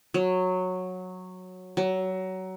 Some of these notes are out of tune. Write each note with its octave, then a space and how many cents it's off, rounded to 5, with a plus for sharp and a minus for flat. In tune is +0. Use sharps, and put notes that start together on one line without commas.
F#3 -10
F#3 +20